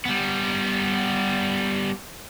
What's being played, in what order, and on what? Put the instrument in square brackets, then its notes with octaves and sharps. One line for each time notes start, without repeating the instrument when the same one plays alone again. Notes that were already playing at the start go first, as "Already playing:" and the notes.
[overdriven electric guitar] G3 B3